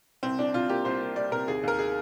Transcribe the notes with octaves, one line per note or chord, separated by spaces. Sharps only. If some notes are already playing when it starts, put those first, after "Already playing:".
C2 C4
C2 D4
C3 F4
A#3 G4
C2 C5
A#3
G3 D5
C3 A#4
D#2 G#4
D#2 A#4
G#4